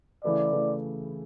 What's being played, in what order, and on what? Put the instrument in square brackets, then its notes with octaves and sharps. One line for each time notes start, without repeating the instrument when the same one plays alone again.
[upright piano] C#3 E3 A3 E4 B4 [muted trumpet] D5
[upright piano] C#3 E3 A3 E4 B4